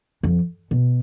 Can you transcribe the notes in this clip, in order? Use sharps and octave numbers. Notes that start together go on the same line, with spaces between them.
F2
B2